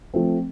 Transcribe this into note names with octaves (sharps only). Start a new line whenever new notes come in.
F3 A3 C4